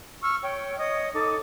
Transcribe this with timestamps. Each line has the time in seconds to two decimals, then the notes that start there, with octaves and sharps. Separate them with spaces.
0.22 C#6 E6 F6
0.42 C#5 G5
0.79 C#5 D#5 D#6
1.14 D#4 A4 D6